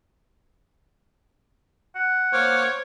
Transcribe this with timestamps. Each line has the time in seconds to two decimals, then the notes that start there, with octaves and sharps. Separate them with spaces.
1.96 F#5
2.33 A#3 C5 C#5 D6 F6